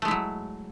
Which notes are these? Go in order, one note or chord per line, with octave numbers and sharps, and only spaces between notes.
F#3 G#3 A3 E4